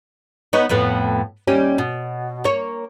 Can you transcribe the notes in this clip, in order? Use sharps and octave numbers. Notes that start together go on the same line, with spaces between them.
B3 D#4 C#5
F2 A2 B3
D#2 G3 C#4
B2
A#3 C#5